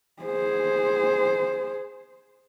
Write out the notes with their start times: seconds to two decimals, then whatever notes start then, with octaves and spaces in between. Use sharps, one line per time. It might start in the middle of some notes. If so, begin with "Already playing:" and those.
0.23 G#4 C5